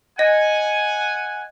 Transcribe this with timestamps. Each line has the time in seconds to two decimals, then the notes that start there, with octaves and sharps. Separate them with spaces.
0.19 D#5 F#5 G#5